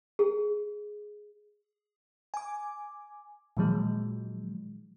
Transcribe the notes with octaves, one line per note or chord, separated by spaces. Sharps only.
G#4
G#5 D6
A#2 D#3 F3 F#3 G#3